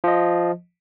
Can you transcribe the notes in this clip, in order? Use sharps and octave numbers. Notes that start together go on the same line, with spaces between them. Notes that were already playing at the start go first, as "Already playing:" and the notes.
F3 D#5